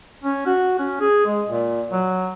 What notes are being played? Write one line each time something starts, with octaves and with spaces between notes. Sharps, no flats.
C#4
F#4
C#4
G#4
G#3
A#2
F#3